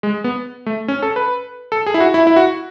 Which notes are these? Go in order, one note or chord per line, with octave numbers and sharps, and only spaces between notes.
G#3
B3
A3
C#4
A4
B4
A4
G#4
E4
F#4
E4
E4
F#4